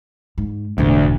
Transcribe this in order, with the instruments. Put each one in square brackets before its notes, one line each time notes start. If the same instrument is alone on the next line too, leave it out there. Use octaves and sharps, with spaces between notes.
[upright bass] G#2
[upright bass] E1 A1 [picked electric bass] D2